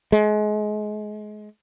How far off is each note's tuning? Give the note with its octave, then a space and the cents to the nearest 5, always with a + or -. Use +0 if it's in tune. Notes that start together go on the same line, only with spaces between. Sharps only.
G#3 +30